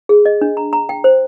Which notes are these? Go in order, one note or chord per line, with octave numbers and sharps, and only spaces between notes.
G#4
D#5
D4
A#5
A#5
G5
C5